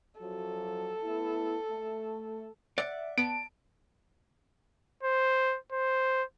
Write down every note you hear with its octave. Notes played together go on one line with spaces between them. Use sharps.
F#2 F3 F#3 A4
A3 B3 E4
A3
D5 E5 F#5
B3 A5 D7
C5
C5